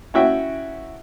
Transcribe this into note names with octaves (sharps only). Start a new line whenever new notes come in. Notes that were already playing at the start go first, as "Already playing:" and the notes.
C#4 E4 F#4 E5 G5